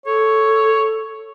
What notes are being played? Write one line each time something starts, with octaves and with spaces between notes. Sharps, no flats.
A4 C#5